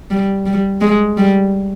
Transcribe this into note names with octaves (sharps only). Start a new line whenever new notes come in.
G3
G3
G#3
G3